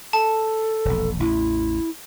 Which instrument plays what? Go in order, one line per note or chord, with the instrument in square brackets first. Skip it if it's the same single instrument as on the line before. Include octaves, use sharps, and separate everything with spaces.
[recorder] A4 [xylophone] A5
[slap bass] E1 A#1
[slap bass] A1 E2 [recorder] E4